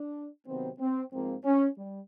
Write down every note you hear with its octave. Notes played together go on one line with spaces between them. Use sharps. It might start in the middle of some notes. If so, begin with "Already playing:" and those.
Already playing: D4
C3 D#3 F#3 B3 C4
C4
G#2 F3 A#3 C4
C#4
G3